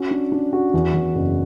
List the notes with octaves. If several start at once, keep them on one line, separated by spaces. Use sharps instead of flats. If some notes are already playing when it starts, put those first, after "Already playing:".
Already playing: C#4 F#4
D4
D4
F#4
E2
E2
F#1